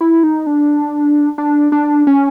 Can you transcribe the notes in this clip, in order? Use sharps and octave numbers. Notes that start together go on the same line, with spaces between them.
E4
D#4
D4
D4
D4
C#4